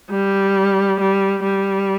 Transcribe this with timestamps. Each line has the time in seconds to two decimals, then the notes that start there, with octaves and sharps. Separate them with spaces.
0.11 G3
1.00 G3
1.43 G3